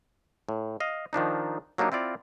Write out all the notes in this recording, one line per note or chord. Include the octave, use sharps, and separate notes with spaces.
A2
D#5 F5
D#3 F3 D4 D#4
F#3 A#3 D4 D#4 G4
C4 E4 F4 D5 F5